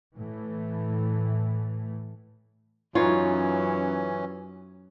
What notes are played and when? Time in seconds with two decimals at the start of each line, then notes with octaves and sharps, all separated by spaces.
0.16 A2 E3 A3
2.95 F#2 E3 C#4 D#4 F4 B4 C#5